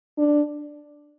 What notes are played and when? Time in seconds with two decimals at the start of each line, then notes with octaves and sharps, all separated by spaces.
0.18 D4